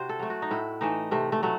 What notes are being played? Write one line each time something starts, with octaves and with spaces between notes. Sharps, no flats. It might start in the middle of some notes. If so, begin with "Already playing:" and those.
Already playing: C3 E4 F#4 C5
A4
F#3 A3
F#4
D#4
A2 E4
E3 A3 D#4
C3 A3
A3
F#3 A3